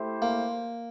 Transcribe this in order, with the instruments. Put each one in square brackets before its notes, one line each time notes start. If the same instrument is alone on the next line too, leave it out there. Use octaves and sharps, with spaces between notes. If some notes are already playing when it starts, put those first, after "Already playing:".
Already playing: [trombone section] A3 E4 G4 C5
[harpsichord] A#3